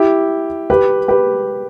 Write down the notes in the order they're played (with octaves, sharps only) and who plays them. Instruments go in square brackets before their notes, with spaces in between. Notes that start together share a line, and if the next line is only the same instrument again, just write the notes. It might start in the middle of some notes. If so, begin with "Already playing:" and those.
Already playing: [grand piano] E4 G4
G4 B4
G4 B4